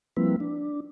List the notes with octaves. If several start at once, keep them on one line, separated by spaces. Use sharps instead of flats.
F3 G3 A#3 C4 E4 B4
D4